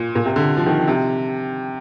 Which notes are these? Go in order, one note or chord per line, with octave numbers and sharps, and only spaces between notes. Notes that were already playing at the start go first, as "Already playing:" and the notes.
Already playing: A#2
A#2
C3
D3
F3
D#3
C3